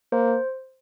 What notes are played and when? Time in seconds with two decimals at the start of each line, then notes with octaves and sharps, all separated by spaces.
0.12 A#3 C5